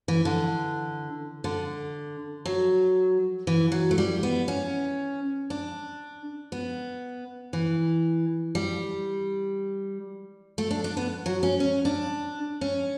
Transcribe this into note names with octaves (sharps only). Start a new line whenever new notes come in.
E3
D3
D3
F#3
E3
F#3
A3
G3
B3
C#4
D4
B3
E3
G3
A3
D4
D4
B3
F#3
C#4
C#4
D4
C#4